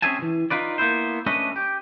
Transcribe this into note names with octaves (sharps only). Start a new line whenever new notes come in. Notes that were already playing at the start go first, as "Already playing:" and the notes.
C4 C#4 G#4 E5 G#5 A5
C#2 E3
D#4 F4 B4 D5
A#3 B3 E4 C5
A3 C#4 D4 A4 B4 D#5
G4